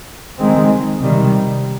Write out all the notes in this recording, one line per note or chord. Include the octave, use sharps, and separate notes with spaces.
D#3 G#3 C4
C3 D#3 G3